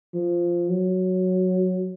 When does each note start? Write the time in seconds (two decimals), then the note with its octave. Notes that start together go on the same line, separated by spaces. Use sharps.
0.14 F3
0.70 F#3